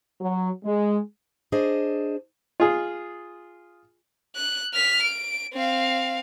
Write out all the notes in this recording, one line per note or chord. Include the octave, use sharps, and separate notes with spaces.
F#3
G#3
D4 G#4 C5 D#5
F4 G#4
F#6
F6 B6
D7
C4 F5